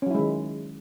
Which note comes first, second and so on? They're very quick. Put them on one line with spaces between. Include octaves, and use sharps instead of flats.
C#4 F#3 E4 G#3 D#3